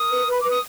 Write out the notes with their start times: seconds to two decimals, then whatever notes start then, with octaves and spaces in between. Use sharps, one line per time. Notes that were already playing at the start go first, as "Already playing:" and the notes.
Already playing: A#4 D#6
0.10 B4
0.26 B4
0.32 B5
0.41 B4 D6
0.50 D#6